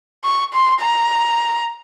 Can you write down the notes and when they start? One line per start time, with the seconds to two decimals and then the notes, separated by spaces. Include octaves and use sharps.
0.24 C#6
0.53 C6
0.81 A#5